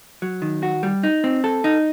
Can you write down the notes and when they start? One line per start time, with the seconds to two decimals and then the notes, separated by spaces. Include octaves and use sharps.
0.22 F#3
0.42 D#3
0.63 F#4
0.83 G3
1.03 D#4
1.24 C4
1.44 A4
1.64 D#4